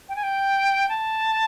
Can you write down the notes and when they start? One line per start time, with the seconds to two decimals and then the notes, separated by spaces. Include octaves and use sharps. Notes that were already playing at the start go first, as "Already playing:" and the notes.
0.09 G5
0.16 G#5
0.23 G5
0.89 A5